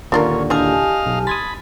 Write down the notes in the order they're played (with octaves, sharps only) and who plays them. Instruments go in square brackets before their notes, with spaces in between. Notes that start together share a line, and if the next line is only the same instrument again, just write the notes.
[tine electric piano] D#2 A#2 D3 [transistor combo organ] C#4 [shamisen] D4 F4 A#4
[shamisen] D4 E4 G#4 [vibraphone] G4 G#5 A5 [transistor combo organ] D#5 F5
[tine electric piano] B1
[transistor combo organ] B5 [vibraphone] C6 [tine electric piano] D#6 G#6 A6